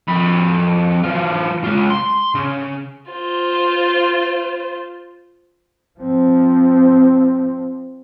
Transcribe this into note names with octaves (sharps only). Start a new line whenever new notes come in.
F2 B5
E3 F4
G#3 F4
C6
C#3
F4 C5
F3 C4